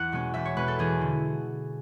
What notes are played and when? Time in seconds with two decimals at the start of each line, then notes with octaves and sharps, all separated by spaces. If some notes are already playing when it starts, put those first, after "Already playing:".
Already playing: E2 F#5
0.12 B2 G#3 C#4
0.34 E2 E5
0.45 C#5
0.56 B2 G#3 C#4 B4
0.68 A4
0.79 E2 G#4
1.01 D3